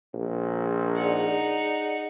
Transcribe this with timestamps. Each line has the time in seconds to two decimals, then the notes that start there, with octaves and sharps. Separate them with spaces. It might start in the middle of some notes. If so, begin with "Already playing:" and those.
0.14 A#1
0.96 D#4 G#4 D5 F#5